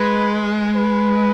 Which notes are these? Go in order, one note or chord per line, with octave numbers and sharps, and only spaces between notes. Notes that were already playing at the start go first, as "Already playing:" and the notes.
Already playing: G#3 B4
B4